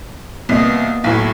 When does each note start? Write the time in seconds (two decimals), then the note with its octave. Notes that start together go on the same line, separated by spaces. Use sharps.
0.49 C2 A#3 B3 D#5
1.04 B1 A2